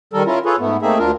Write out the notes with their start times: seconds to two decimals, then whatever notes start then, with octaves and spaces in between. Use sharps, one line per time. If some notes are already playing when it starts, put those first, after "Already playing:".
0.13 D#3 G3 A4 A#4
0.26 C#4 E4 F4 A#4
0.45 F4 G#4 A4 B4 C#5
0.59 G#2 A3 B3
0.82 A3 A#3 C4 D#4 G#4 E5
0.99 D2 D4 F4 A#4